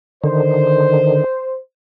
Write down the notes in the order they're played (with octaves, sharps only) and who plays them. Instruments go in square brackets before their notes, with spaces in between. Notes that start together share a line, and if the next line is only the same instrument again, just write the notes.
[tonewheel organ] D3 D#3 [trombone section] C5